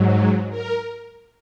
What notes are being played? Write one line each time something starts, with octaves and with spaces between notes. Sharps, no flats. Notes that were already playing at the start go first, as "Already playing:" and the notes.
Already playing: G#2 F#3
A#4